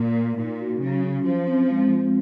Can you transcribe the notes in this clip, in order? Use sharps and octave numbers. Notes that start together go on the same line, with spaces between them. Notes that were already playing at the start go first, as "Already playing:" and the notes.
Already playing: A#2 A#4
A#4
A#2 D#4
F#4
C#3 F#3
C#4
F3 C5
C4
G#3
F4